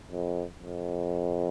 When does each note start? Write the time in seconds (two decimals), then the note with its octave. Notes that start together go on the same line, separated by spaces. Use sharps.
0.12 F2
0.59 F2